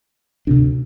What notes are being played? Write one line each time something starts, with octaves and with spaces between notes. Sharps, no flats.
D2 C3 D4